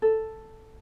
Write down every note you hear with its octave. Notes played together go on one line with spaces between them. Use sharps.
A4